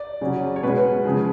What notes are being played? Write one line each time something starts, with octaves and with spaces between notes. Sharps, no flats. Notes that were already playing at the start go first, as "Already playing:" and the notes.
Already playing: D5
C#3 F#3 C#4
C#5
B2 G#3 C#4 B4
C#3 F3 G#3